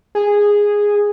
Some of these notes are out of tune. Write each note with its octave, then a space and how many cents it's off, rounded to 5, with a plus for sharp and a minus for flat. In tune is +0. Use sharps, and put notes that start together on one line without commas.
G#4 -10